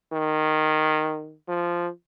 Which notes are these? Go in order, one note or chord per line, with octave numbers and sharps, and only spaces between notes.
D#3
F3